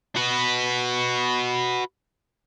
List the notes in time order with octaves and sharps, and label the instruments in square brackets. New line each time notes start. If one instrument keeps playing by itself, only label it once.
[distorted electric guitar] F#4 B4